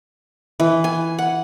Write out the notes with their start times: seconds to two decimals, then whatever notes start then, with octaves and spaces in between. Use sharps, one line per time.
0.60 E3
0.84 G#5
1.19 F#5